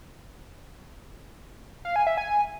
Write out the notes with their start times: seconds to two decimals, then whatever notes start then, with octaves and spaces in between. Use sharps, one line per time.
1.85 F5
1.96 G#5
2.07 E5
2.18 G#5